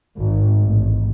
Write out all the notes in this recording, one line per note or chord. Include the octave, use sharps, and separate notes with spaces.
G#1
A1